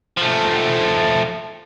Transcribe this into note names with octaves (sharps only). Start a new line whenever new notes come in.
F3 A3